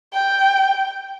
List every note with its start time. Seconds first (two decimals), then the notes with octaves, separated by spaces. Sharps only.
0.14 G5